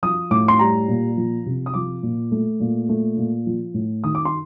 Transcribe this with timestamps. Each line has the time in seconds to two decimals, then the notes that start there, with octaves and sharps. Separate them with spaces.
0.03 F3 D#6
0.31 A2 D6
0.48 C6
0.59 G3 A#5
0.88 A#2
1.17 F3
1.46 C3
1.66 D#6
1.74 F3 D6
2.03 A#2
2.32 A3
2.60 A#2
2.89 A3
3.17 A#2
3.46 F3
3.74 A2
4.04 D#3 D#6
4.15 D6
4.25 C6